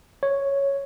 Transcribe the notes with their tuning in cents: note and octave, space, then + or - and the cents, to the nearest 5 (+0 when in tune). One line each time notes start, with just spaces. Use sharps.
C#5 +0